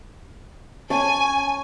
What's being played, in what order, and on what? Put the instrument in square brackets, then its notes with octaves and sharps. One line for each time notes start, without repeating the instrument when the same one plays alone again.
[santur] C#4 A5 [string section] G#5